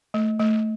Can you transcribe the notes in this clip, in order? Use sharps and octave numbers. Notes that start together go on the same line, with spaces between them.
A3
A3